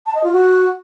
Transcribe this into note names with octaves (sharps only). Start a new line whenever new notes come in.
A5
D#5
F4
F#4